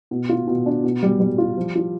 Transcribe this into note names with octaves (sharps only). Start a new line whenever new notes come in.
B2
F4
B2
D4
B2
G3
G3
F4
F3
F4